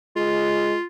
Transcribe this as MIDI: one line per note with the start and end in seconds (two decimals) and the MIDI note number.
0.16 0.75 56
0.16 0.85 65